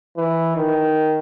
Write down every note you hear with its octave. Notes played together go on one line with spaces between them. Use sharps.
E3
D#3